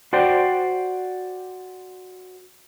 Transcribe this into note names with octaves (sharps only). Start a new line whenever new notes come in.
F#4 C5 D5 G5